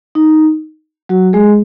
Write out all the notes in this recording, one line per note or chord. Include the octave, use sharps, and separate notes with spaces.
D#4
F#3 F#4
G#3 G#4